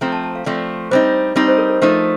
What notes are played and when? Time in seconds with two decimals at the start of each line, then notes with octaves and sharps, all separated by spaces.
0.01 F3 A3 C4 A#5
0.12 A5
0.23 A5
0.35 F5
0.46 F3 A3 C4 D5
0.91 G3 C4 D#4 C5
1.36 G3 C4 D#4 D#5
1.48 C5
1.58 A#4
1.69 A#4
1.81 F3 A3 D#4 C5